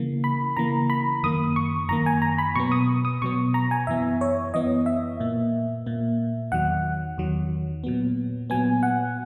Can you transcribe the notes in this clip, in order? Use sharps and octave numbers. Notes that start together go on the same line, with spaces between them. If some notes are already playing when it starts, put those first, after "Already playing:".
Already playing: C#3 E3 A#3
B5
C#3 E3 A#3 A#5
B5
F#2 D#3 A#3 D#6
C#6
F#2 D#3 A#3 A#5
G#5
A#5
B5
B2 F#3 B3 C#6
D#6
D#6
B2 F#3 B3 C#6
A#5
G#5
F#2 E3 B3 E5
C#5
F#2 E3 B3 D#5
E5
A#2 A#3
A#2 A#3
E2 D#3 F#3 F#5
E2 D#3 F#3
A#2 F#3 B3
A#2 F#3 B3 G#5
F#5